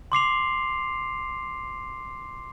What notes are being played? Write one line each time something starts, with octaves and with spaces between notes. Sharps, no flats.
C6 D6 C7 F7